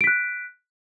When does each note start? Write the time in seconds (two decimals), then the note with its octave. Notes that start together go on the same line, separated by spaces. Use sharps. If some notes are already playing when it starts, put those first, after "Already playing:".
0.01 D7
0.04 B6
0.07 F#6